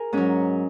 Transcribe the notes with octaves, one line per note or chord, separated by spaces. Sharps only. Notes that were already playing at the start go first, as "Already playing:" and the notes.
Already playing: G#4 A#4
G#2 F#3 C#4